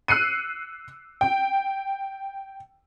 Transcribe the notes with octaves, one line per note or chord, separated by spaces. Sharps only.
E6 F#6 C7 C#7 D#7
G5